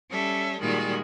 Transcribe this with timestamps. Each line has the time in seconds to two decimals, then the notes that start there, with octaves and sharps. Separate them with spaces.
0.11 G3 C#4 A4 C#5 E5
0.61 A#2 D#3 G3 G#3 F#4 G#4